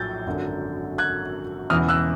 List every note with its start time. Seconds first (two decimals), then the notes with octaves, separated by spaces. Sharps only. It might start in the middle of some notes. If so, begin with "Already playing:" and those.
Already playing: A#1 A2 F#3 G6 A6
0.26 G#1 F#2 D3 F#3
0.98 F#6 G#6
1.70 E1 E2 C#3 E3 D#6 F6
1.89 E6 F#6